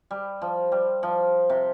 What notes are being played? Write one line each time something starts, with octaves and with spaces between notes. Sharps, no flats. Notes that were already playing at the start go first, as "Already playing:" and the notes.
G3
F3
G3
F3
C3